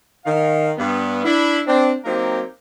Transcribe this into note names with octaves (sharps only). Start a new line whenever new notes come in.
D#3 F5
G2 B3
D4 E4
C4 D4
F#3 A#3 C4 D#4 G4 A#4